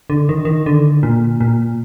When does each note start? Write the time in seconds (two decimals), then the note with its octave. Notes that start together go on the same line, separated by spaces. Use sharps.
0.10 D3
0.29 D#3
0.45 D#3
0.66 D3
1.03 A#2
1.41 A#2